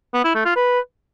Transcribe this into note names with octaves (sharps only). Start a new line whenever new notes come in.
B3
E4
A3
F4
B4